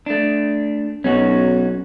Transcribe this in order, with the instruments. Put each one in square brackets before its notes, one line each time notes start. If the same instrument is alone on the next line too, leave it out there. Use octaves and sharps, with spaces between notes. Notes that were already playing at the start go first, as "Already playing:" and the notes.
[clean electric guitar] A3 D4
[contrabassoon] B1 [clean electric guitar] C#4 D#4 F#4